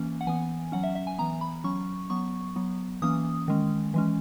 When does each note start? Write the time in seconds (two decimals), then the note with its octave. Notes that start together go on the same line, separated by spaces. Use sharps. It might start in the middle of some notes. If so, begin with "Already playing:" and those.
Already playing: E3 A#3 C#4
0.21 F#5
0.27 E3 B3 G#5
0.72 F#3 C#4 F#5
0.83 E5
0.95 E5
1.07 G#5
1.18 E3 B3 A#5
1.41 B5
1.64 F#3 C#4 C#6
2.10 F#3 B3 C#6
2.56 F#3 B3
3.02 E3 A#3 C#4 D#6
3.48 D#3 G#3 C#4
3.94 E3 G#3 C#4